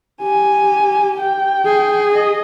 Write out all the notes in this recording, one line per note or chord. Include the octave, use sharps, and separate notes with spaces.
G4 G#5
G5
G#4
D#5